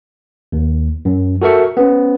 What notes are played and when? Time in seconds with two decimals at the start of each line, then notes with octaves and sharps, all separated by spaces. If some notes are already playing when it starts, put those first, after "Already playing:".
0.52 D#2
1.05 F#2
1.42 F#4 A4 A#4 E5 C#6
1.77 B3 C#4